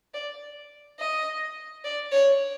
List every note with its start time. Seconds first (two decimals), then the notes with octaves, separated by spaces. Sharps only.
0.14 D5
0.99 D#5
1.84 D5
2.12 C#5